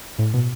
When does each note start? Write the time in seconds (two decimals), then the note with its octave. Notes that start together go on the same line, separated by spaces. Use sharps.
0.18 A2
0.34 B2